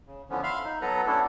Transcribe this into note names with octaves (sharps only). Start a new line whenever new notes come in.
C#3
D3 E3 F3 B3 C#4
E5 F5 B5 C6 F6
D#4
F#3 B3 A4 B4 A#5
A3 B3 C#4 D4 E4 A4